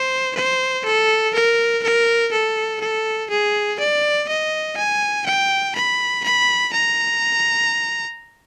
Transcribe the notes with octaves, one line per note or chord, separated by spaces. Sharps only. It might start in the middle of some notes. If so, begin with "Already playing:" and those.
Already playing: C5
C5
A4
A#4
A#4
A4
A4
G#4
D5
D#5
G#5
G5
B5
B5
A#5